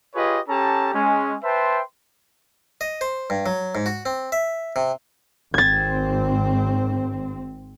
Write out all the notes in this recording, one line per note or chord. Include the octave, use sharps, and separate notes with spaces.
F4 G4 G#4 B4 C#5 D#5
C#4 G4 A4 A5 A#5
G#3 C#4 G#5
B4 C5 E5 G5 A5 C6
D#5
C5
G2
F#3
G#2
F#4
C4
E5
C3
G#1 C4 G#6 A6